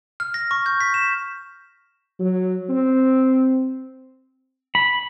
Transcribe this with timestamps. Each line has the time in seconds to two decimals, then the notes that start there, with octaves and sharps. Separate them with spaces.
0.20 F6
0.34 A#6
0.51 C#6
0.66 G6
0.81 B6
0.94 E7
2.19 F#3
2.69 C4
4.75 B5